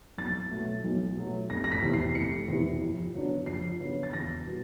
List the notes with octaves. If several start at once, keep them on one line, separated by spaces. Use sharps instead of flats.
B1 A6
B2 F#3 A3
B1
B2 F#3 A3
F1 A#6
A#6
B6
E2 C3 E3
C7
F1 C#7
E2 C3 E3
F2
C#3 F#3 B3 D4
F2 C7
C#3 F#3 B3 D4
A6
E2 A#6
B2 G3 B3